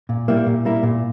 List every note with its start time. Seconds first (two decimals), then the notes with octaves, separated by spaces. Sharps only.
0.09 A#2
0.28 G3 A#3 E4
0.46 A#2
0.65 G3 A#3 E4
0.83 A#2